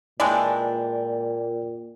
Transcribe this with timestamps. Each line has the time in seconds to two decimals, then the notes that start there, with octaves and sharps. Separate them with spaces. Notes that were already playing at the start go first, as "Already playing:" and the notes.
0.20 A#2 E3 G#3 D4 D5 G5